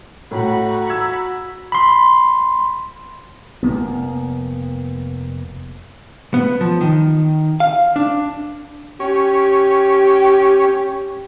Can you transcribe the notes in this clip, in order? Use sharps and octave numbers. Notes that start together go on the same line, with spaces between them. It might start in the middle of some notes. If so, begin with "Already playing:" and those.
A2 F#4 A#5 B5
E6 G#6
B5 C6
F1 A#3 B3
B3
F3
D#3
F5
D4
C#4 G4